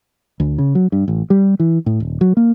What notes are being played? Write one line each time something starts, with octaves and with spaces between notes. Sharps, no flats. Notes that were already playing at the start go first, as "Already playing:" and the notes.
D2
C#3
F#3
G2
A1
G3
E3
A2
D#1
F#3
A#3